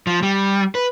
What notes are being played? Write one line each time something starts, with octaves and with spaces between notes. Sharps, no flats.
F3
G3
B4